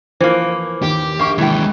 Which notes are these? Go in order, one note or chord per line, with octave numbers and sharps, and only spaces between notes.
E3 F3 A#3 C5
D#2 G4
A#1 A#3 C#6
D#2 E3 G#3 G5